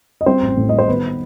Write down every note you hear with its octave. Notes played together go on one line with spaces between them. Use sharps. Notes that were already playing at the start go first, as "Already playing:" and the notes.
D#5
G3 C4 C5
A1
A2
G3 D#5
C5
D#3 B3 B4